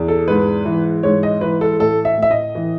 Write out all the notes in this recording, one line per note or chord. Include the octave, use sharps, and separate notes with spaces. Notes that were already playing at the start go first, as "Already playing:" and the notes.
Already playing: E2
A4
G#2 B4
E3
G#2 C#5
D#5
E3 B4
A4
A2 A4
E5
A2
E5
D#5
E3